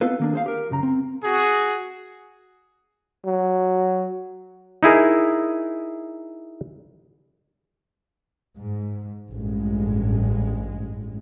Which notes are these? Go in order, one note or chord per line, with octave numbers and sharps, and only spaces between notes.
B3 C4 D#4 F4 A4 B4
D#3 A#3 D4
G#4 C5 F5
G4 A#4
C#2 F#2 C#3 A#5
C4
F#4 G#4
F#3
D#4 E4 G#4 A#4
G#2
A1 G2 G#3